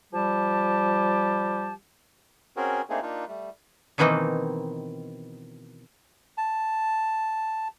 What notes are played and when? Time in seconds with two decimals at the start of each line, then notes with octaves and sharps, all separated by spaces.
0.13 F3 G3 G4 A5
2.57 C4 C#4 F#4 G#4 A#4
2.90 A3 A#3 C4 D4 D#4 G#4
3.02 A#3 D4 D#4 F4
3.28 G3 A3
3.98 B2 D#3 E3 A#3 C4 D#4
6.38 A5